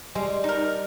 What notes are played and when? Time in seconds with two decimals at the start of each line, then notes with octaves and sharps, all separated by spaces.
0.15 G3 G#3
0.44 D#4 A#4